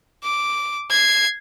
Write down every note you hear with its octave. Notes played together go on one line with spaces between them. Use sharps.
D6
G#6 C7